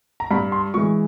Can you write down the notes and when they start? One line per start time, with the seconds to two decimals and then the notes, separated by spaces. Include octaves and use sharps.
0.20 A#5
0.31 G2 B5
0.52 C6
0.74 E3 G#3 C#6